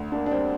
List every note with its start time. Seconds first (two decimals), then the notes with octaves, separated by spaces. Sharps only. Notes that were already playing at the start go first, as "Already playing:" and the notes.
Already playing: D2
0.12 A#3 D4
0.26 D4
0.31 G3 C4